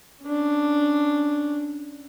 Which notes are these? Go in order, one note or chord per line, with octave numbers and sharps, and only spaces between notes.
C#4 D4